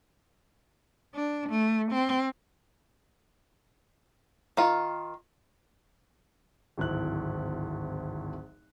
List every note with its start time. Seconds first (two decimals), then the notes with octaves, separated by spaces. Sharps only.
1.15 D4
1.50 A3
1.92 C4
4.57 D#3 F4
6.78 D1 G#1 E4 F#6